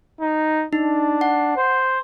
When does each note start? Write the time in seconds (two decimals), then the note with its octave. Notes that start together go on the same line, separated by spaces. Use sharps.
0.21 D#4
0.73 D4 D#4
1.21 F#5
1.57 C5